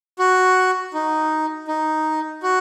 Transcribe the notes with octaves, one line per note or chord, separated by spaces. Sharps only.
F#4
D#4
D#4
F#4